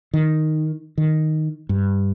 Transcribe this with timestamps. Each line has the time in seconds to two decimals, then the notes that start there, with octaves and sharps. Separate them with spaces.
0.14 D#3
0.98 D#3
1.69 G2